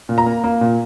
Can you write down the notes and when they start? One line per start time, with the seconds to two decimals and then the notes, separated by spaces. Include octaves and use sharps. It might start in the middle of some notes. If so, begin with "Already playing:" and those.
0.09 A#2
0.18 A#5
0.26 A#3
0.44 A#3
0.61 A#2